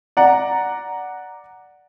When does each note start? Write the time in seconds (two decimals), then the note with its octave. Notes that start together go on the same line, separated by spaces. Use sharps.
0.17 D5 F#5 A#5